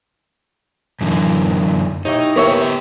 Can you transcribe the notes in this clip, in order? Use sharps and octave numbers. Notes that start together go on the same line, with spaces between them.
F#2 D3 E3
D#4 E4 G4 C#5
B3 G4 A#4 C#5 E5